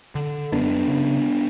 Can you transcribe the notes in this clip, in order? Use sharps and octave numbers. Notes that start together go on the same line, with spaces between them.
D3
F#2 B3 D4
C#3